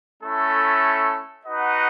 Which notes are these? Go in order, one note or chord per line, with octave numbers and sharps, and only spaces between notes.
A3 C#4 E4 A4
D#4 F#4 B4 D#5 F#5